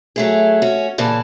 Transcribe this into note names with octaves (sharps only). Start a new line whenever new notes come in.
F#3 A3 G#4
C#4 F#4
A#2 C#3 E3 A5